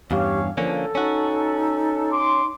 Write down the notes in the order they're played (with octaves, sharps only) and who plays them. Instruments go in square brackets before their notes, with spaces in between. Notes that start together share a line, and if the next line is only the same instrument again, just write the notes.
[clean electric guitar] E2 G2 [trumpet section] C#4 C#5 F5 [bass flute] G4
[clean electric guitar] D3 A#3 C#4 [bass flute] F3 [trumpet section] A4
[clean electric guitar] C#4 F#4 [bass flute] D#4
[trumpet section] C6 D6